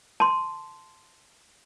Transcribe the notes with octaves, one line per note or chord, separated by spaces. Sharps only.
A5 C6